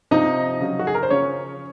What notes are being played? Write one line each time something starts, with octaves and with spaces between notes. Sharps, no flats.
C3 F3 D#4 D#5
C#3 F#3
F#4
G#4
A#4
C5
C#3 F3 C#4 C#5